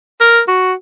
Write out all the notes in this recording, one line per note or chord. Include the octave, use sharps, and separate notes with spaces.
A#4
F#4